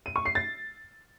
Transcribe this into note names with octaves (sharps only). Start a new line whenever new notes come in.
D#7
C#6
C7
A6